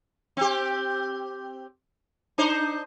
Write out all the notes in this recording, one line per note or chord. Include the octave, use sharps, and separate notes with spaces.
C4 G4
D4 D#4 C5